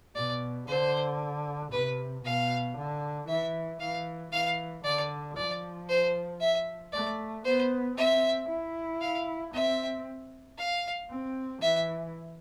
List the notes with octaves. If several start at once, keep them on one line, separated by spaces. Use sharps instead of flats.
B2 D5
D3 C5
C3 B4
B2 F5
D3
E3 E5
E3 F5
E3 F5
D3 D5
F3 D5
C5
E5
A3 D5
B3 C5
C4 E5
E4
F5
C4 E5
F5
C4
E3 E5